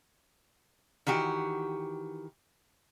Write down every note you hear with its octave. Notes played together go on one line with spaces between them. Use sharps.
D#3 E3 F#4 G4